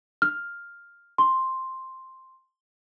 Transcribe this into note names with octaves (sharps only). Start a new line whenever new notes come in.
F6
C6